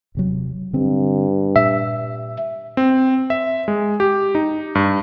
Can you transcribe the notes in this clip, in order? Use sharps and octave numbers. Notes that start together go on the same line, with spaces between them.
D#1 C3 F#3
G2 D3 C4
A#2 E5
C4
E5
G#3
G4
D#4
G2